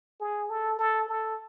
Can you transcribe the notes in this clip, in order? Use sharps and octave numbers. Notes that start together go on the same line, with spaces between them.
G#4
A4
A4
A4